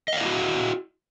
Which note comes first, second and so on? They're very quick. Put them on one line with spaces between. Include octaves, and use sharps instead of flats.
D#5 F5 D5 E4 F#4